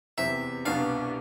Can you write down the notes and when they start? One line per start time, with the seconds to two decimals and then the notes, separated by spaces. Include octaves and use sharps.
0.18 E2 C3 E3 E5
0.65 C2 B2 B3 D4 F5